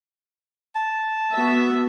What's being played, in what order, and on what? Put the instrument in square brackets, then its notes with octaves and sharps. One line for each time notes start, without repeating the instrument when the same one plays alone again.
[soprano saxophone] A5
[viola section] B3 F#4 E5